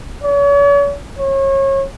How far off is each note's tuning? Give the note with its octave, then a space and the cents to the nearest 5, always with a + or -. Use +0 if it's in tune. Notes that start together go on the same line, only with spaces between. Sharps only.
C#5 +40
C#5 -30